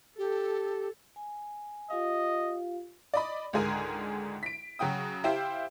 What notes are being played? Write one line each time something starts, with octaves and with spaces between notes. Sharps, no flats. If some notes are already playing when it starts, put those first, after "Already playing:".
G4 A4
G#5
F4 G4 D#5 F5
D5 D#5 B5
C#2 G#2 D3 G#4 A#4 G#5
B6 D7
C#3 F#3 F#4 G5 D#6
E4 G4 C5 E5 F5